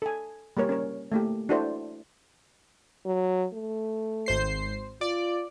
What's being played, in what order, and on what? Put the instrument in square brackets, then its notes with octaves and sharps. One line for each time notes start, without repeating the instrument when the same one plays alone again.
[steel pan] A4 G#5
G3 A#3 A#4 C#5
C#4 A#4 C#5
A3 A#3 G4
D4 E4 F#4 A4 C5 D5
[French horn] F#3
A3
[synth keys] G#1 C5 C7
[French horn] F4 [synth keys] D5